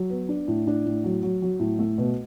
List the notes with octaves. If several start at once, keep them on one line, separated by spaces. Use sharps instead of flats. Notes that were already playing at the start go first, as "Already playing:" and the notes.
Already playing: F#3
B3
D4
A2
D4
A2
F#3
F#3
F#3
A2
A3
B2